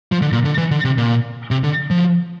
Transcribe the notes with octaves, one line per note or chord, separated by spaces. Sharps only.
F3
D3
A#2
D3
E3
D3
C3
A#2
C3
D3
F3